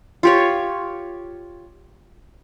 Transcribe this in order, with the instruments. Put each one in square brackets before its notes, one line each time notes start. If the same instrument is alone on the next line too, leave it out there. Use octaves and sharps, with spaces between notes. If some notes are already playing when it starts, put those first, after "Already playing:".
[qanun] F4 G4 C#5